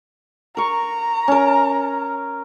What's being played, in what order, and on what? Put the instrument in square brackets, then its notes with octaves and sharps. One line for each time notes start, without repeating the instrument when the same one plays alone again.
[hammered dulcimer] A#4 C#6 [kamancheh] A#5
[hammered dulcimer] C#4 A#4